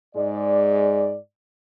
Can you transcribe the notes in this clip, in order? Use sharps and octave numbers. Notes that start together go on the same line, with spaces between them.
G#2 G#3 D5